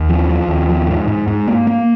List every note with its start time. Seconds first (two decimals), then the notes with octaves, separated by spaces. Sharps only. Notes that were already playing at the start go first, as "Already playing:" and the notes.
Already playing: D#2
0.09 F3
0.29 F3
0.49 D#2
0.69 F3
0.88 G#2
1.08 G#2
1.28 G#2
1.48 A#3
1.67 A#3